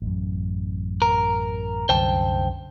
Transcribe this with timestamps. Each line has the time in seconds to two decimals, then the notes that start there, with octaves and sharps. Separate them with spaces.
0.02 A1 F#2
1.02 A#4
1.89 C2 F#2 D3 C5 G5 A5